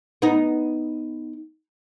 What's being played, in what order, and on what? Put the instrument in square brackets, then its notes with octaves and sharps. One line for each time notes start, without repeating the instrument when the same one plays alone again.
[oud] B3 D#4